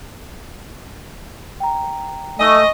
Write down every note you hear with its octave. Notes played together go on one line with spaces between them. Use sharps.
G5 A#5
A3 D#5 G#5 C#6